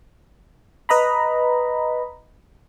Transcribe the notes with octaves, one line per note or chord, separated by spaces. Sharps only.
B4 D#5 A#5 B5